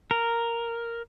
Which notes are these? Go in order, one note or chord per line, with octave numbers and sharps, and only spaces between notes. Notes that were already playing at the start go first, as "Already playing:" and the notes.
A#4